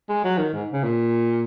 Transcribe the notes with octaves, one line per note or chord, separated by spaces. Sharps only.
G#3
F#3
D#3
G#2
C#3
A#2